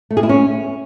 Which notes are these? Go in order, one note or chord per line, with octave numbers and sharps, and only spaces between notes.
A3
G#4
E4
C#4